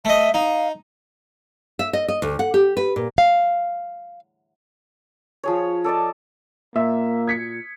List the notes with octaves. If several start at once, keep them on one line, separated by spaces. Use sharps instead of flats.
A3 D#5 E5
D#4 F5
E5
D#5
D#5
D2
F#5
G4
B4
A#2
F5
F3 G#4 C#5
A4 D5 D#5 A5
A#2 A#3 E5
G#6 B6 C#7